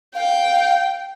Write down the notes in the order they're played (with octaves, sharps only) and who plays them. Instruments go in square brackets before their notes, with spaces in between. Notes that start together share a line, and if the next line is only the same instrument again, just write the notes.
[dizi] F5 [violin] G5